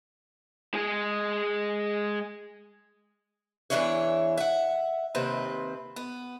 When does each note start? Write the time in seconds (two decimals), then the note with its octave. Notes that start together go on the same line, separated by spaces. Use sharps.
0.74 G#3 G#4
3.70 E2 B2 E3 D4 E4 C#5
4.37 E5 F#5
5.15 D#2 C3 C4 B4
5.96 B3